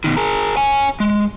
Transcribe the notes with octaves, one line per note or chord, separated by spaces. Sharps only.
B2 D#3
G#4 A#4
C#5 G#5
G#3